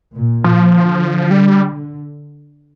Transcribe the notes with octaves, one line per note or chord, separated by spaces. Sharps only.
A#2
F3
D3
G3